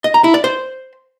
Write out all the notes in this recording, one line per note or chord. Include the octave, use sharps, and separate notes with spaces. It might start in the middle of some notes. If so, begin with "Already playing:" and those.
D#5
A#5
E4
D5
C5